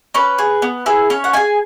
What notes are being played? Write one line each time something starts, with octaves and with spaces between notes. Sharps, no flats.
C#4 B4
G#4
B3
E4 G#4
C#4 C#5
F#5
E4 G#4 G#5